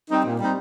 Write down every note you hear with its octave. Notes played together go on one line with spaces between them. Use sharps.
G3 C4 D#4
A#2
G3 C4 D#4